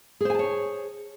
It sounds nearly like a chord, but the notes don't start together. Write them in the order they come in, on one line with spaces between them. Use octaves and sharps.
G#4 C5 G#5 A5 C#5